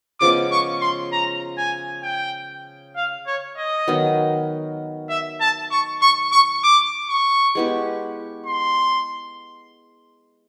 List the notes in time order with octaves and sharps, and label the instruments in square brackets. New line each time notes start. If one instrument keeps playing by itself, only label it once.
[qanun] C#3 F3 G#3 B3 [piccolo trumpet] D6
[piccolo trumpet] C#6
C6
A#5
G#5
G5
F5
C#5
D#5
[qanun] D#3 F#3 B3
[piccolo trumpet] E5
A5
C#6
C#6
C#6
D6
C#6
[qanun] G#3 B3 E4 G4
[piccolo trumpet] C6